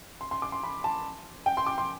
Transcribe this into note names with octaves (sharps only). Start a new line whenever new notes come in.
C6
C6
D6
C6
B5
A5
G5
C6
D6
C6